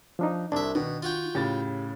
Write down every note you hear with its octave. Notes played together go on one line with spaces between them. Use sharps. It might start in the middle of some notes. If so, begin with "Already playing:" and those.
F3 D4 D#4
C2 D4 E5
B2 D#3
F4 F#4 G5
A2 C#3 G4 A6